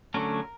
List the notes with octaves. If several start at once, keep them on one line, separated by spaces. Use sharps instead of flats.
D3 F#3 A3 C#4 A#4